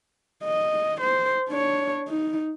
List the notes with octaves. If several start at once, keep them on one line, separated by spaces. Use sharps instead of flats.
D#5
C5
D4 C#5
D#4